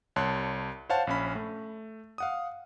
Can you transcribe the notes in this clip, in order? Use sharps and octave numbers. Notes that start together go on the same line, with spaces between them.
C2 C#5 A5 C6 F#6
C5 C#5 F5 F#5 A5
A#1 C#4 B5
A3
F5 F#5 D#6